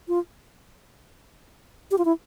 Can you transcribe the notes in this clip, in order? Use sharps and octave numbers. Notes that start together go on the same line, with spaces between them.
F4
G4
F4
E4